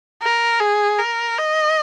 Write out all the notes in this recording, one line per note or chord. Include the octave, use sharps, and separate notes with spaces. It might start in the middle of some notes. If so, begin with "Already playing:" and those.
A#4
G#4
A#4
D#5